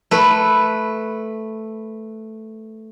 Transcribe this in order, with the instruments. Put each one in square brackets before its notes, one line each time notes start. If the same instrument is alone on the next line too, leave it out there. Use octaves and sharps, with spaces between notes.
[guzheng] A3 B4